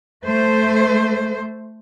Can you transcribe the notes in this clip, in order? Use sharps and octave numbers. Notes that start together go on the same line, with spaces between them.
A3 C5